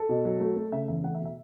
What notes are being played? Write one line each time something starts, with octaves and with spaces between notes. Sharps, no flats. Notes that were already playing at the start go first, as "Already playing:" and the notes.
Already playing: A4
B2
F#3
A3
A3
C#3 E5
E2 E5
A3 F#5
E5
B2
E5